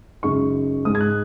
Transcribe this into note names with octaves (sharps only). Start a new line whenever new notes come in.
F#2 C#3 G#3 D#4 C#6
G#2 G#3 D#4 D#6
G#6
F#6